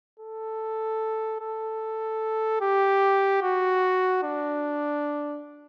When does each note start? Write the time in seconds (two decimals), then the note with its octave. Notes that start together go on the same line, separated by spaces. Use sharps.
0.19 A4
1.41 A4
2.61 G4
3.42 F#4
4.23 D4